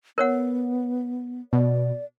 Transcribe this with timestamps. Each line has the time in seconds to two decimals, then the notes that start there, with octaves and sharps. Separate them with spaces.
0.18 B3 A#4 C#5 F#5
1.53 B2 D5